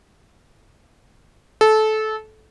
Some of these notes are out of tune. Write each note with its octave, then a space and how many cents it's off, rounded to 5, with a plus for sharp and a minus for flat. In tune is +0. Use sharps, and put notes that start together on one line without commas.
A4 -20